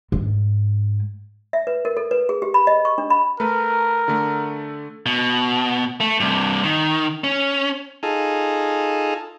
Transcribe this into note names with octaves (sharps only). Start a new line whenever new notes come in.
G#2
E5
B4
A#4
A4
B4
G#4
G4
B5
D#5
C#6
D4
B5
A3 A#4 B4
D3 A3
B2
A3
G2 C3
D#3
C#4
D#4 F4 G#4 A4